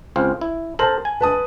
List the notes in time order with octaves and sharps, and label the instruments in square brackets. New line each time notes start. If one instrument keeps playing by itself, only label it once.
[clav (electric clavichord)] C#2 C4 F5
E4
[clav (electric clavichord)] A4 A#4 C5 [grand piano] A5 F#7
[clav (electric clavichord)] G#5
[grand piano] B4 A5 D#6